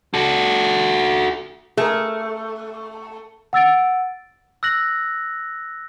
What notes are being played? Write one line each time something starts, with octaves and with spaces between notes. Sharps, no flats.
F#4 A4
A3 G#4 A#4
F#5 E6 A6 D7
E6 F#6 A#6 F#7